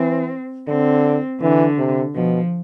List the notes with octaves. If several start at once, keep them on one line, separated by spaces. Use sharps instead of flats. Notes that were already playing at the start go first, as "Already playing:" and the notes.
Already playing: E3 C4
D3 C4
D3 E3
C3
B2 F3